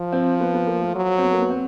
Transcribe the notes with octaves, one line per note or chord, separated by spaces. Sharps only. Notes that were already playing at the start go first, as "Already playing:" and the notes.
Already playing: F3
C4
B3
B3
A#3
A3
F#3
C4
B3
A#3
B3
C4